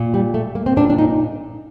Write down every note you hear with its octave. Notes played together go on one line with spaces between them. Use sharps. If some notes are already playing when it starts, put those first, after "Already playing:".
Already playing: A#2
G3
A3
A#3
C4
A#2 D4
D4
D#4